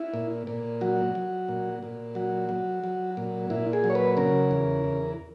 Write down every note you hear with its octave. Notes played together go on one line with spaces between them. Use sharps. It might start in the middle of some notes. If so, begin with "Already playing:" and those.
Already playing: E4
A#2
A#2
F#3 F#4
F#3
A#2
A#2
F#3 F#4
F#3
F#3
A#2
A#2 E4
G#4
F#3
C#5
B4
C#3 A#4
E2
E2